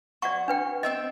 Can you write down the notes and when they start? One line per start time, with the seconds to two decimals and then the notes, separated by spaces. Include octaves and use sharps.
0.22 F#4 D5 F#5 C#6
0.48 D4 B4 G5
0.83 C4 D#5 E5 G5